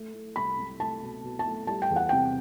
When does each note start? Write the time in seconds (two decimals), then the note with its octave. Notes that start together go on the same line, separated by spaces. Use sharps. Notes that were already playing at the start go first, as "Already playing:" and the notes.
Already playing: A3
0.14 A3
0.36 C2 B5
0.58 C2
0.80 A3 A5
1.02 B2
1.24 B2
1.39 A5
1.46 A3
1.67 G3 A5
1.82 G5
1.90 E2
1.96 F#5
2.09 C3 G5